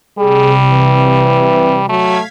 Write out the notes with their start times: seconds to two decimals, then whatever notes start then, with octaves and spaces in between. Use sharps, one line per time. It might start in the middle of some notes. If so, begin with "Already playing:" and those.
0.19 C3 G3 G#4
0.69 E3
1.89 F#3 A3 F5 G#6 B6